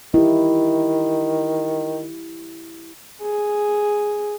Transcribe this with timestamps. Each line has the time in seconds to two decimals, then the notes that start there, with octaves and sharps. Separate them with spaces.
0.14 D#3 E4 G4
3.22 G#4